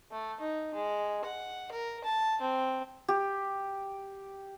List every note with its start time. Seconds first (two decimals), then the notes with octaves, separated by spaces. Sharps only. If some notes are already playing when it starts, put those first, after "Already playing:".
0.11 A3
0.40 D#4
0.74 G#3
1.25 F#5
1.72 A#4
2.04 A5
2.41 C4
3.08 G4